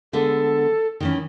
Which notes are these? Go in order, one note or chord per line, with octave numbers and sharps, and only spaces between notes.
D3 G#3 B3 A4
D#3 E3 C#4